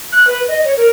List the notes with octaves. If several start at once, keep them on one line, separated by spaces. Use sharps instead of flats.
F#6
B4
D#5
C#5
A#4